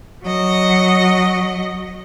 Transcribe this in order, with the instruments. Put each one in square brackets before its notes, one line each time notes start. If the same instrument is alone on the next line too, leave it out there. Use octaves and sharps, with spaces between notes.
[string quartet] F#3 D#5